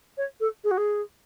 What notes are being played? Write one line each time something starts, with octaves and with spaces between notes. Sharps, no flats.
C#5
A4
G#4
F#4
G#4